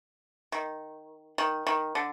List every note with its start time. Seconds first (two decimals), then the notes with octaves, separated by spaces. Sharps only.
0.52 D#3
1.38 D#3
1.67 D#3
1.95 D3